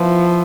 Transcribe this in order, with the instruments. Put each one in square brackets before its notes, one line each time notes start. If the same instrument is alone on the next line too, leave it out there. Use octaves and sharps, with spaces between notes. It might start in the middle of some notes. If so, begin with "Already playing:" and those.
Already playing: [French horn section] F3 [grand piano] B3 E4 B4